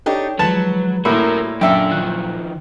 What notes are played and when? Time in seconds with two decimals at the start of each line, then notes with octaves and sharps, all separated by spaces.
0.06 D4 D#4 G4 A4 C#5
0.39 D#3 F3 F#3 G#3 B4 A5
1.05 A2 G3 A#3 F#4 A#4 B5 C6 E6
1.61 F#2 A#2 D4 A4 E5 G5
1.92 D#3 F3 F#6